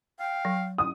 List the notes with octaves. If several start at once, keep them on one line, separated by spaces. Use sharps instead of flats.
F5 G5
F#3
D#6